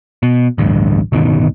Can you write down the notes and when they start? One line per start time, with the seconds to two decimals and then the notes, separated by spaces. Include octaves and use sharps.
0.23 B2
0.58 A1 D2 G2
1.12 D1 G1 B2 D#3